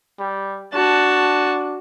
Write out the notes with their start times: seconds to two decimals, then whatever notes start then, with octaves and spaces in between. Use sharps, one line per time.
0.19 G3
0.74 D4 F#4 A5